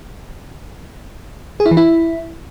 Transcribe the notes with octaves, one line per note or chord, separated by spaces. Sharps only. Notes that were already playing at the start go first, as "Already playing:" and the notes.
G#4
E4
E3
E4